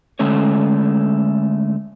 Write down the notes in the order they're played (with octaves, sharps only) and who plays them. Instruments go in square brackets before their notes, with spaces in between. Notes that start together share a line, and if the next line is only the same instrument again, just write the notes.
[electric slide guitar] D3 G#3 A3 C#4 C#5